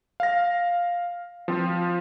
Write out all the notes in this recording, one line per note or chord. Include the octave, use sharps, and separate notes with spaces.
F5 A#6
F3 C4 F4